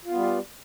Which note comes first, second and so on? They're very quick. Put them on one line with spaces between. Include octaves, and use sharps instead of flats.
F4 B3 G3